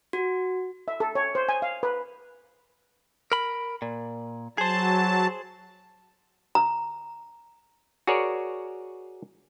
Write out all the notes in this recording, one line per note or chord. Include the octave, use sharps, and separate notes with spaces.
F#4
E5
A4
C#5
C5
G#5
F5
B4
A#4 B5
A#2
F#3 G#4 C5 A5
A#5
F#4 G#4 A#4 C#5 D5